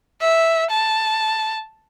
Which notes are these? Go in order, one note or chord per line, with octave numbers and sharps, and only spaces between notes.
E5
A5